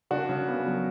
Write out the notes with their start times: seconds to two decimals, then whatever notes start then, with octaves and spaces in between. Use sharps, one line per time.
0.11 C#3 D4 F#4
0.29 C#3
0.48 B3
0.66 F#3